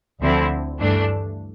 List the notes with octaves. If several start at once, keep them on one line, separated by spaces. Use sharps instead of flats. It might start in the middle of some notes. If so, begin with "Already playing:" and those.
D2 D3 F3 C4 E4
G2 E3 A3 D4